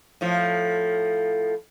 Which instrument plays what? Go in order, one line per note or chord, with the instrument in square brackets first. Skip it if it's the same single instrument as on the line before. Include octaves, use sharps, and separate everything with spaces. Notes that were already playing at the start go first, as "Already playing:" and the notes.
[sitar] A2 F3